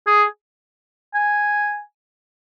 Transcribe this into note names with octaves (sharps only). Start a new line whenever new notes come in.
G#4
G#5